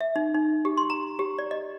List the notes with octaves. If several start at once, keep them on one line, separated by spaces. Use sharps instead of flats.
E5
D#4
D#4
G4
C6
A#5
G4
D5
D#5